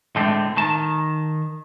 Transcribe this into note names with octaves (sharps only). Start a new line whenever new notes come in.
A2 D3 G#3 A3 C4
D#3 A5